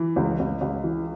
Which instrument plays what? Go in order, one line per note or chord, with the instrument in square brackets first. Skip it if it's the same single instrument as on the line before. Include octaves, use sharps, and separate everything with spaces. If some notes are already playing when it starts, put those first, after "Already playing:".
Already playing: [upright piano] E3
C#2
C#2
C#2
E3